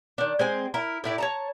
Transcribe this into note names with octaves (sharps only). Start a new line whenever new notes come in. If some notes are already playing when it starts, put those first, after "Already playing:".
D#3 D4
G#3 C4 G#5
E4 A#4
A2 E4 D5
C#5 A5 A#5